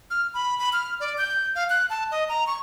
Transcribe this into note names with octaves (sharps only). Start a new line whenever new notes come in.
F6
B5
B5
F6
D5
G6
F5
F#6
A5
D#5
A#5
C#6